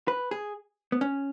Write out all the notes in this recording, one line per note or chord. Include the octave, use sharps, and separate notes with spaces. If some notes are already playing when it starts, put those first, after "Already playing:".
B4
G#4
B3
C#4